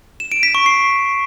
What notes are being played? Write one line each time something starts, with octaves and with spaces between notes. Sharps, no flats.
E7
D7
B6
C#6
C7